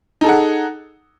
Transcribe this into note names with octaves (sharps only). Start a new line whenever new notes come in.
D#4 G#4 A4 F#5